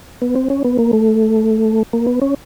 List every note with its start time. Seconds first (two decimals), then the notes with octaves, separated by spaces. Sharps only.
0.22 B3
0.35 C4
0.50 C#4
0.64 B3
0.78 A#3
0.93 A3
1.93 A#3
2.07 B3
2.22 C#4